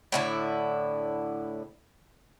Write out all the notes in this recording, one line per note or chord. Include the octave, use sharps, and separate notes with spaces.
A2 D3 E4